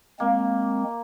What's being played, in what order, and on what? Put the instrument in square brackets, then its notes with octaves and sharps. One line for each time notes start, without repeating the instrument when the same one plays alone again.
[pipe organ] G#3 C4 [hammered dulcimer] A#3